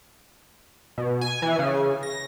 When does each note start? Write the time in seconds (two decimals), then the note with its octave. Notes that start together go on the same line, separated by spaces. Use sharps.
0.98 B2
1.21 G#5
1.42 E3
1.59 C#3
2.03 A#6